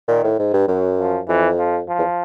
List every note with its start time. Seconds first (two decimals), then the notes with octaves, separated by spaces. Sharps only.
0.08 A#2 D#3
0.24 A2
0.39 G#2
0.54 G2
0.68 F#2 F#3
0.98 F3
1.28 F2 E3
1.58 F3
1.88 F3
1.98 E2